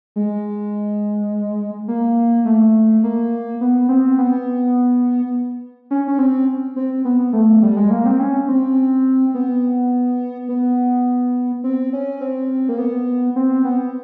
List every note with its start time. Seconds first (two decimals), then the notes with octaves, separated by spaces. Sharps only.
0.16 G#3
1.88 A#3
2.45 A3
3.03 A#3
3.61 B3
3.89 C4
4.18 B3
5.91 C#4
6.07 C#4
6.18 C4
6.76 C4
7.05 B3
7.33 A3
7.62 G3
7.77 G#3
7.91 A#3
8.05 C4
8.20 C#4
8.48 C4
9.34 B3
10.49 B3
11.64 C4
11.93 C#4
12.21 C4
12.69 A#3
12.78 B3
13.36 C4
13.65 B3